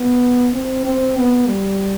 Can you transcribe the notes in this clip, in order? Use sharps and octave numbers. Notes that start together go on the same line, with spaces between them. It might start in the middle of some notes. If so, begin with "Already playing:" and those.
Already playing: B3
C4
C4
B3
G3